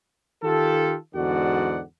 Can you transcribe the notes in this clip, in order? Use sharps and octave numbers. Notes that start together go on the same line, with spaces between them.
D#3 F4 G4 A4
E2 G#2 D3 F#4 D5 F#5